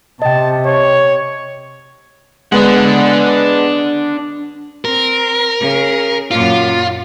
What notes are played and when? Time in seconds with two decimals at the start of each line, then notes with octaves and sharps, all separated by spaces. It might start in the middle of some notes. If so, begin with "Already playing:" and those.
0.22 C3 D#5 G5 A5
0.66 C#5
2.52 G#3 B3 D4 F#5
4.85 C4 A#4
5.59 C#3 G#4
6.31 F#2 A#2 F4